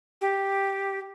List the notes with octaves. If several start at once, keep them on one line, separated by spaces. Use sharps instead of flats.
G4